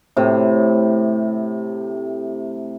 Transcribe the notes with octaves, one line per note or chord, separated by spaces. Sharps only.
A2 C3